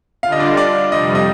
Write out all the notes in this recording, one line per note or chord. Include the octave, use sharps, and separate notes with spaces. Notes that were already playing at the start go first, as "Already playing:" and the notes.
D3 G3 D4 F4 F5
D#5
D5
D#5
D5
F2 C3 G3 D#5
D#5